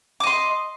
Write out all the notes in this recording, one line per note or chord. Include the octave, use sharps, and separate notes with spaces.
D#5 C6 D6